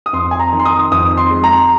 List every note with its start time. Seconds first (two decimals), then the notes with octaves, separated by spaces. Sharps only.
0.06 D#6
0.13 F2 C6
0.31 G#5
0.40 A#5
0.52 D#3
0.60 C6
0.65 D#6
0.91 F2 D#6
1.17 C6
1.31 G#3
1.44 A#5